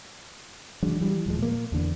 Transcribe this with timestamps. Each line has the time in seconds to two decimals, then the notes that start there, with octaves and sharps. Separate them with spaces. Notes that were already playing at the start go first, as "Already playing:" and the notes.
0.82 E3 F#3 G#3 D4
1.01 E3 G3
1.26 D#1 F3 G#3
1.39 A#2 A#3
1.72 E2 D3